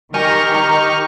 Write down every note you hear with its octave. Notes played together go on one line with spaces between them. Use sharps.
D#3 G4 A#4 G#5 C#6 F6
D#4 A#5